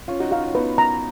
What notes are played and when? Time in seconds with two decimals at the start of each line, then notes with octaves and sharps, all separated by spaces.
0.08 C#4 F4 F5
0.20 D#4 F#4
0.31 D#4 F#4 F5
0.43 C#4 F4
0.55 B3 D#4 B4
0.78 A#5